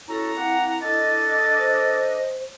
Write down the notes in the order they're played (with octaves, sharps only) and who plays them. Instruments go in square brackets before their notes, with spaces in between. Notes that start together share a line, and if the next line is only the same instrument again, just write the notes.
[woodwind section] C#4 F#4 A4 [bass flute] E4 [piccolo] A#5
[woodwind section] A#3 C4 F#5
[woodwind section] D4 A4 D#5 [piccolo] A6
[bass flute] C5